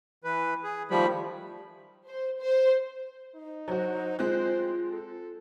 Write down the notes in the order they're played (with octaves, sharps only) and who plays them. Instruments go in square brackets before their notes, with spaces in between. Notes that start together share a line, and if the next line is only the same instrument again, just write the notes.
[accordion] E3 B4
G#4
[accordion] D#3 A3 B5 [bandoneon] F3 G3
[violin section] C5
C5
[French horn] D#4
[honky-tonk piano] F#3 F#4 [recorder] C5
[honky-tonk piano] G#3 C4 F#6 [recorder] F4 [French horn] C5
[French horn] A4